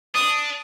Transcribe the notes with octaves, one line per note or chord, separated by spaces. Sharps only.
D4 D#6